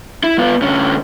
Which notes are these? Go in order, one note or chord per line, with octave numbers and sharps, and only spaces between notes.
E4
B3 F4
D2 C#4